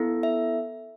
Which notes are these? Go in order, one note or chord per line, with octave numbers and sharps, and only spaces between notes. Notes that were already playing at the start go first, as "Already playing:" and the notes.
Already playing: B3 E4 A4
E5